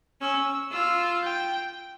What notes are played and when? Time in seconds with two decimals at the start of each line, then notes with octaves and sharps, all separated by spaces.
0.21 C#4 E6
0.71 F4 E6
1.22 G5